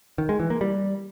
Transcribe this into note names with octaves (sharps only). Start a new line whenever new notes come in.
D#3
G#3
E3
A#3
G3